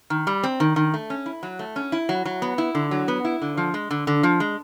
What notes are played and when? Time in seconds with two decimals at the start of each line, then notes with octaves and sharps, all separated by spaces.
0.10 D#3
0.27 G3
0.43 C4
0.60 D#3
0.76 D#3
0.94 A3
1.10 C#4
1.26 E4
1.43 F#3
1.59 A3
1.76 C#4
1.92 E4
2.09 F#3
2.25 F#3
2.42 B3
2.58 E4
2.75 D3
2.91 F#3
3.08 B3
3.25 E4
3.42 D3
3.57 F3
3.74 G#3
3.91 D3
4.07 D3
4.23 F3
4.40 G#3